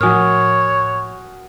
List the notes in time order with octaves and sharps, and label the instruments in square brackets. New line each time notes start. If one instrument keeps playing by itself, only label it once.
[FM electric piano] A2 F3 [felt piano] F#4 A#4 [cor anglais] C#5 [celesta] G#5 D#6 F6